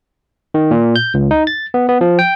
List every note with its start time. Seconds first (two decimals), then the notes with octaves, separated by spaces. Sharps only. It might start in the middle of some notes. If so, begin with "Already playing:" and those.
0.54 D#3
0.71 A#2
0.96 G6
1.14 C#2
1.31 D#4
1.47 A6
1.74 B3
1.89 B3
2.01 F3
2.19 G5